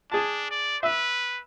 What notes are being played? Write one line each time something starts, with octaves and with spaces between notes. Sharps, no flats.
D4 G#4 A5
D5
B4 E5